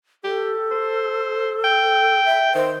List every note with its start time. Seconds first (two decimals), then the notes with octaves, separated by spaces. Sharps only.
0.24 G4 A4
0.71 C5
1.64 G5
2.25 E5
2.55 D#3 C5